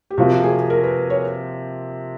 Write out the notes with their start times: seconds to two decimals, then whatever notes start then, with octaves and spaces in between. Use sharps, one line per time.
0.10 G4
0.17 C3 F3 A#3 F#4
0.44 G#4
0.70 A#4
0.83 B4
1.10 C#5